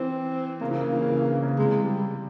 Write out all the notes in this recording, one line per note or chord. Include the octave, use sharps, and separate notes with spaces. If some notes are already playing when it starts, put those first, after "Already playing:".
Already playing: E3 C4
C#3 A#3
E3
C#3
E3
C#3
E3
C#3
E3
C#3
C3 G#3
G3